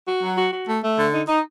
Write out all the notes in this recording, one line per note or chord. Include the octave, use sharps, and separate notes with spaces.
F#4
F#3
F#4
F#4
A3
A3
D3
D#4
D#4